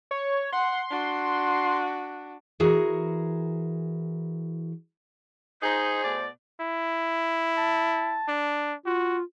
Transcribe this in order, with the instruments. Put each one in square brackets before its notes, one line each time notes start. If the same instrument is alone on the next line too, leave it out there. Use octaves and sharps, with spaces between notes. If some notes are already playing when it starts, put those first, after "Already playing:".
[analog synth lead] C#5
[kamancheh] F#5 [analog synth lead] C6
[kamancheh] D4 F#4
[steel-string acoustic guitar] E3 F#4 G#4 A#4
[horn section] D#4 [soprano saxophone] G#4 [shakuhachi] C5
[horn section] B2 A3 D5
[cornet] E4
[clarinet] A5
[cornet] D4
[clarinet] F4 [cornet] F#4